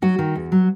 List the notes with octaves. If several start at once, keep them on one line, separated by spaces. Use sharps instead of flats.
F#3 F#4
D#3
E2
F#3